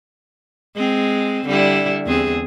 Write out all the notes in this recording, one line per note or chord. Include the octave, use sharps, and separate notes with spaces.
G#3 C4
D3 G3 E4
E2 C4 G#4